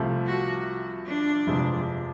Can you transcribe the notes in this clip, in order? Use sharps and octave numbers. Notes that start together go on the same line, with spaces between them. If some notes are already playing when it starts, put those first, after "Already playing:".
Already playing: C2 C3 F3 A3
F#4
D4
G1 F2 C3 F3 G#3